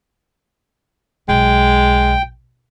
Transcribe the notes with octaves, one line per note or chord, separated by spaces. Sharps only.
B1 G#3 G5